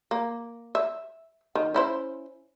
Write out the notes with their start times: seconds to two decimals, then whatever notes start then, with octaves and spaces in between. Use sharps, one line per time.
0.11 A#3
0.75 E5
1.55 D#3
1.74 C#4 E4 C5